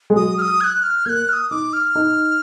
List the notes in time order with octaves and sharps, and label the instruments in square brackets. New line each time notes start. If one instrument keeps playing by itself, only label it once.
[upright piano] G#3
[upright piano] F#3 [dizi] D#6
[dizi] F6
D#6
G#6
F#6
F6
[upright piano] A#3 [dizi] F#6 G#6
[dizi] F6
D#6
[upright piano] D#4 [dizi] D6
[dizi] F6
[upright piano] D#4